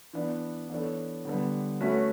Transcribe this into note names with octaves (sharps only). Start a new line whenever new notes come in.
E3 B3 D4
E3 B3 D4 A4 C#5
D3 G3 B3
A3 C#4 F#4 B4